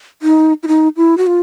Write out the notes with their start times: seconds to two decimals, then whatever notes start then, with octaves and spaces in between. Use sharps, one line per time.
0.22 D#4
0.63 E4
0.68 D#4
0.97 E4
1.18 F#4
1.27 F4